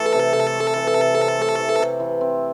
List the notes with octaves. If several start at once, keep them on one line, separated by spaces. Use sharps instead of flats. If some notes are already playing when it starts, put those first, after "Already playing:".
Already playing: E3 A3 A4
C3
C3
A3
E3
C3
C3
A3
E3
C3
E3
C4